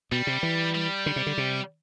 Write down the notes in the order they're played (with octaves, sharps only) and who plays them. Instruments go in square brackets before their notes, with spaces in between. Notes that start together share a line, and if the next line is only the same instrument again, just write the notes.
[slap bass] B2 [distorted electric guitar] G3
[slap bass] C3
E3
[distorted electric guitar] G3
[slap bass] D3
C3
D3
C3